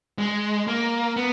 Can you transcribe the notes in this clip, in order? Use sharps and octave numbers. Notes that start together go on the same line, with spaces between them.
G#3
A#3
B3